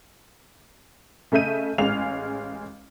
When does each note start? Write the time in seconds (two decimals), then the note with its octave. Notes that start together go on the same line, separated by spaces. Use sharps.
1.32 C#3 A3 D#5 E5 G6 D#7
1.78 A1 G#3 C#4 F5 F6 F7